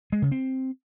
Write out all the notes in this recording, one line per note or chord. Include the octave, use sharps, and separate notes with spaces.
G#3
C#3
C4